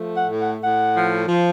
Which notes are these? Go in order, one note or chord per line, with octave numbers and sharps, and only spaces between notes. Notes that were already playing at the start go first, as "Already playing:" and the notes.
Already playing: F3 A3
F#5
A2
F#5
A2 F#5
F3
F3